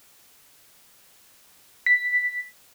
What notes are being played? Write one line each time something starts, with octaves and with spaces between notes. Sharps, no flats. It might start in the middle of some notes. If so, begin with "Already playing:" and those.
B6